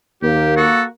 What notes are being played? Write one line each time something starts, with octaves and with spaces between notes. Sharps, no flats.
D#2 A#3 G4
F#4 A4